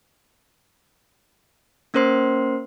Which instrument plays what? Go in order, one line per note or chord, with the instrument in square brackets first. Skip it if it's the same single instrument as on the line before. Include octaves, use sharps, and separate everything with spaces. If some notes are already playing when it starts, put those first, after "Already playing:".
[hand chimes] A#3 C#4 A#4 C5 C6 C7